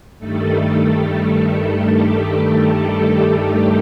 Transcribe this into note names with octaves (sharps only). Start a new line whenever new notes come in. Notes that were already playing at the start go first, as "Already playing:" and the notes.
G2 D#3 G3 A3 A4
G3 G4